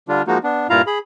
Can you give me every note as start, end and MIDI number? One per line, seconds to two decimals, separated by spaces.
0.08 0.22 50
0.08 0.22 55
0.08 0.22 62
0.08 0.22 65
0.27 0.38 53
0.27 0.38 56
0.27 0.38 58
0.27 0.38 63
0.27 0.38 66
0.44 0.67 59
0.44 0.67 62
0.70 0.82 43
0.70 0.82 46
0.70 0.82 64
0.70 0.82 65
0.70 0.82 77
0.70 0.82 82
0.87 0.99 68
0.87 0.99 83